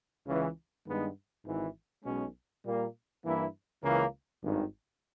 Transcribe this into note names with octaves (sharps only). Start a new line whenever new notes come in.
C#2 C#3 E3
G2 D#3 G#3 B3 D#4
G#1 G#2 E3
B1 B2 G#3 C#4
A#2 G3 A#3
G2 E3 A#3 E4
C#2 C#3 E3 A#3
G#1 G2 D#3